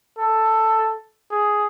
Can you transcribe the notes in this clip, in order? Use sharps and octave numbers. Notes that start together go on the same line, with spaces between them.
A4
G#4